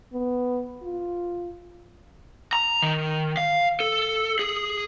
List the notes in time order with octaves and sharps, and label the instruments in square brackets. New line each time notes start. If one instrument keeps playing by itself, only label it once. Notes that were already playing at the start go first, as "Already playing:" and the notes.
[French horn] B3
F4
[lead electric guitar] A#5
D#3
F5
A4
G#4